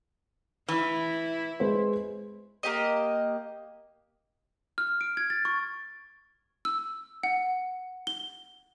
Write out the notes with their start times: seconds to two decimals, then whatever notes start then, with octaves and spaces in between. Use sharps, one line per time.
0.68 E3 E4
1.60 G#3 B4 C5
2.63 A#3 G4 D#5
4.78 F6
5.01 D7
5.17 G#6
5.30 A6
5.45 C#6
6.65 E6
7.23 F#5
8.07 G7